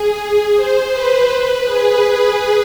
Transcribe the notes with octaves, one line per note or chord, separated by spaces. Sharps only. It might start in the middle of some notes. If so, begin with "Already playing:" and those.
Already playing: G#4
C5
B4
G#4